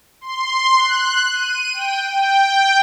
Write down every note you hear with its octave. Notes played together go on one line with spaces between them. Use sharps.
C6
F#6
D#7
G5
G5